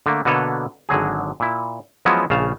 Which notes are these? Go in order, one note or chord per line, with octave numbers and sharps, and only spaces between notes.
D3 A3 A#3
B2 D3 A#3 A4 B4 C#5
G#1 D3 F#3 G#4
A#2 E4
F3 F#3 G#3 B3 C#4 E4
A#1 C#3 F5 A5